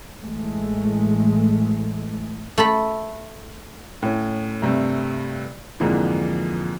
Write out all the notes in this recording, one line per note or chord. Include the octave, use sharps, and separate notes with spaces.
A1 E3 G#3 A3
A3 A4 B5
A2 C#4
G2 C3 G3 A3
F2 G#2 D3 E3 F3 A#3